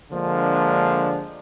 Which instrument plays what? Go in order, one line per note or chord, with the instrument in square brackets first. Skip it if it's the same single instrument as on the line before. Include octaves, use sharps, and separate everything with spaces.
[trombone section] D3 F3 G#3 A#3 D4